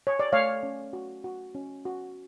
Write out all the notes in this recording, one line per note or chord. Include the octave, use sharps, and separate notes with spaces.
C#5
D5
A3 C#5 F5
C#4
F#4
F#4
C#4
F#4